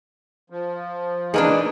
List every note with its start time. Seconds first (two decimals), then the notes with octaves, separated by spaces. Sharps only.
0.50 F3
1.34 E3 A#3 D4 D#4 G#4 A#4 B4 A#5